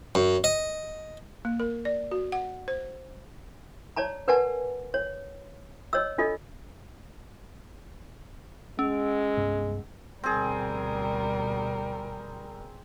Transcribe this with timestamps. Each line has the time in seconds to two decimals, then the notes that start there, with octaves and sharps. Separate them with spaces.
0.15 F#2
0.44 D#5
1.45 A#3
1.60 A#4
1.85 D5
2.11 F#4
2.32 F#5
2.68 C5
3.96 C#5 D5 A5 A#5
4.28 A#4 B4 D5 F#5 G#5 A5
4.94 C#5
5.93 C#5 D#5 E6
6.18 D4 F4 A4 D#5
8.79 G#3 C#4
9.37 C2 G2 B3
10.24 D2 B2 G3 C4 G#4 A#4